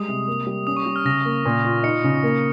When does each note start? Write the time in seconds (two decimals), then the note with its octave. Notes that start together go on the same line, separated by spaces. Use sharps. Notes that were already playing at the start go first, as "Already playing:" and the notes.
Already playing: G3 G#3 D#6
0.08 C3
0.28 A#3
0.47 G3
0.67 C#4 D#6
0.77 C#6
0.86 G3
0.96 F6
1.05 C#3 A#6
1.25 A#3
1.45 A#2
1.65 F4
1.83 D#4 C#7
2.04 C#3
2.23 A#3